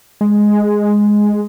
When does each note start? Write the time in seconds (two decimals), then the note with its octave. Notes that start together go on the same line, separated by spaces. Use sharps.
0.21 G#3